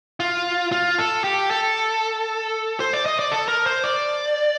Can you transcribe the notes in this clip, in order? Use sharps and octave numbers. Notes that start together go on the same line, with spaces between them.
F4
F4
A4
G4
A4
C5
D5
D#5
D5
A4
A#4
C5
D5